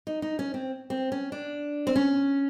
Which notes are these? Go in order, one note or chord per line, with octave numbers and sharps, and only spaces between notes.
D#4
D#4
C#4
C4
C4
C#4
D4
C4
C#4